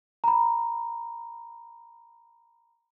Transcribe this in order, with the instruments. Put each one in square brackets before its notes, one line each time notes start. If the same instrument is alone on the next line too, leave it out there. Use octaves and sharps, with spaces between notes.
[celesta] A#5 B5